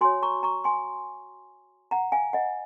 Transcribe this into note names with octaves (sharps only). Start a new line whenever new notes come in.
F#4 C#5 G#5 C6
A#5 C#6
A#5 C#6
G#5 C6
F#5 A#5
F5 G#5
D#5 F#5